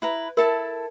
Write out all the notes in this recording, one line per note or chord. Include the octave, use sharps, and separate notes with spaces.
E4 B4 A#5
E4 A4 A#4 A5